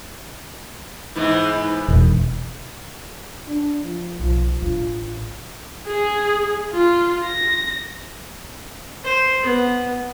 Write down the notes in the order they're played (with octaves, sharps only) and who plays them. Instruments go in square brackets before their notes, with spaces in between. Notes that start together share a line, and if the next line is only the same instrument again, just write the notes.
[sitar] G#2 E3 B3
[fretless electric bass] E1
[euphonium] D4
F3
[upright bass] B1 [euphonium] F3
[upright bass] A1 D4 [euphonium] F4
[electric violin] G#4
F4
A#6
[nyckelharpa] C5
B3